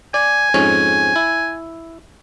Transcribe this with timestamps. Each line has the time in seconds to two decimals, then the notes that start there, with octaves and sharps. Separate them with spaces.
0.14 D5 G#5
0.54 F2 G#2 C#4
1.16 E4